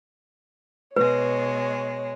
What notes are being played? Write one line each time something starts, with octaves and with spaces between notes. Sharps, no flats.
B2 G#3 B4 C#5